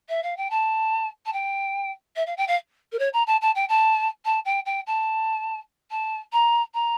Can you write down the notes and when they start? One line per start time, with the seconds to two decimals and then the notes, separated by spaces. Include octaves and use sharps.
0.09 E5
0.23 F5
0.37 G5
0.50 A5
1.26 A5
1.33 G5
2.16 E5
2.26 F5
2.37 G5
2.48 F5
2.92 A#4
2.99 C#5
3.13 A#5
3.27 A5
3.41 A5
3.55 G5
3.69 A5
4.25 A5
4.45 G5
4.65 G5
4.86 A5
5.90 A5
6.32 A#5
6.74 A#5